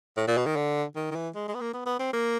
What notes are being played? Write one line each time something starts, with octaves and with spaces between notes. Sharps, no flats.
A2
A#2
B2
D#3
D3
D#3
D#3
E3
G#3
G#3
B3
A#3
B3
B3
C4
A#3